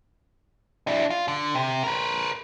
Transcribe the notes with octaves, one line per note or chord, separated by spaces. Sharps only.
D4 E4
F4
D3
C3
A#4 B4